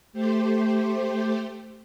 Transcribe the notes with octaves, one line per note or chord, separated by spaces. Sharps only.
A3 G4 C5